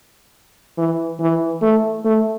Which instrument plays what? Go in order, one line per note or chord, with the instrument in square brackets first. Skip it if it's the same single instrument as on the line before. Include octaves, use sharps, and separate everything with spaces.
[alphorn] E3
E3
A3
A3